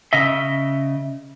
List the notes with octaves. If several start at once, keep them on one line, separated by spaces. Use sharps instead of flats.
C#3 D#5 E5